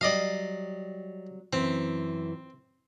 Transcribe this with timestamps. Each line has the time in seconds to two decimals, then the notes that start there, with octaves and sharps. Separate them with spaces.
0.01 F#3 G3 D5 D#5 F5
1.53 F#2 E3 C4